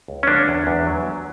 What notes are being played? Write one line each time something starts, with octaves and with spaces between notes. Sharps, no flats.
C#2
C#4
D3 D4
E2
E2
F#3
F#3